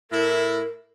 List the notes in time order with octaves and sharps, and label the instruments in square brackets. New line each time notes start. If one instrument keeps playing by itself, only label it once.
[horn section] A2 E4 [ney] A#4